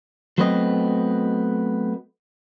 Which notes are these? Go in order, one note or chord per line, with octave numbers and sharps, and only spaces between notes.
F#3 A3 B3 C4 B4 D#5